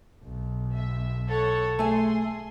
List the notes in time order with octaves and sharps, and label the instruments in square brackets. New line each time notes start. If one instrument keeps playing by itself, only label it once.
[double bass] B1
[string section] E5
A4 C#5 F#5
[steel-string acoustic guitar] A3 G#5 [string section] G#4 C6